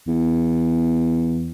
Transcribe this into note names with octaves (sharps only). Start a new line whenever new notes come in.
E2